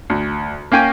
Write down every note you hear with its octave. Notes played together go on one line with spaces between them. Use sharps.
D2
A#3 C#4 G5 G#5